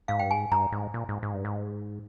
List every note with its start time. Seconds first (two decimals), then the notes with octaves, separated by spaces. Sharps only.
0.08 G#2 F5
0.19 G2 G5
0.31 G#2 G#5
0.51 G2 A#5
0.72 G#2
0.94 A#2
1.09 G#2
1.23 G#2
1.34 G2
1.45 G#2